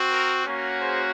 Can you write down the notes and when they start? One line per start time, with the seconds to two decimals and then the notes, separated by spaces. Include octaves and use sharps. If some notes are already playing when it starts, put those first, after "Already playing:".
Already playing: C4 F#4
0.09 A#4
0.45 A#3 C#4 F#4
0.80 G#4 C5